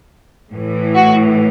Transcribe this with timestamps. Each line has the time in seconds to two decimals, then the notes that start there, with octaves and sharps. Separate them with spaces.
0.51 A2 E3
0.95 F#4